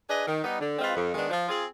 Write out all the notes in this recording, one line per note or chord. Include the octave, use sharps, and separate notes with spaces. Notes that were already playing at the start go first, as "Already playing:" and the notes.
D4 G#4 B4 D#5
D#3
G3 B3 D#4
D3
G#3 C4 F4 B4
F2
D#3 G#3 B3 D4
F3
C4 F4 G#4